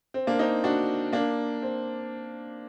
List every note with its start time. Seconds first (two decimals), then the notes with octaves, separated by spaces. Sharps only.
0.14 C4
0.27 A#3 D4
0.39 C4 D#4
0.64 D4 F#4
1.13 A#3 D4
1.62 C4